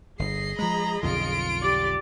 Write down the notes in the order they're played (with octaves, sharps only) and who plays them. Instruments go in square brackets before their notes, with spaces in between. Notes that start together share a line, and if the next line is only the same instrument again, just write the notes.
[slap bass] G1 [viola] G#4 D#5 [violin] C7
[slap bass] F3 G#3 [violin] A#5 B5
[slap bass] B1 F2 D3 [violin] F4 D7
[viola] G4 D5